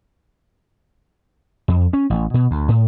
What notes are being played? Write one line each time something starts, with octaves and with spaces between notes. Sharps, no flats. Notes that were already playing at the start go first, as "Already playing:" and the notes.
F2
C#4
A1
B2
D2
A2